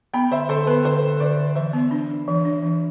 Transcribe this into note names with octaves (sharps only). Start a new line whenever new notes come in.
B3 G5 B5
D3 C5 E5
D3 A4 C5
B3 B4
D3 A4 C5
D3
D3 B4 D5
D3
E3 C5 E5
B3
D4
D4
E3
D4
E3